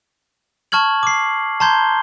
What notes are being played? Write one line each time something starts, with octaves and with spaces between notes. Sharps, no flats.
A5 C#6 F6 G#6 F#7
D6 C7
A5 A#5 C6 G6 G#6 G7